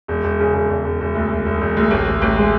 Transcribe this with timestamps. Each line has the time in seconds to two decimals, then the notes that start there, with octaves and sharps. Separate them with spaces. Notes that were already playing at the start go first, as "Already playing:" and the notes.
0.08 E1
0.24 E1
0.40 C#3
0.54 E1
0.69 E1
0.84 E1
1.01 E1
1.15 D2
1.30 E1
1.46 E1
1.61 E1
1.77 D2
1.91 A1
2.07 A1
2.22 A1
2.37 G#3